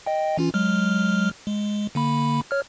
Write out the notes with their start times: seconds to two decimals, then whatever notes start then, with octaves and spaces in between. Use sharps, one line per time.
0.06 D#5 G5
0.38 E3 C#4 F4
0.54 F#3 G#3 F6
1.47 G#3
1.95 D3 A#3 B5
2.51 C#5 F6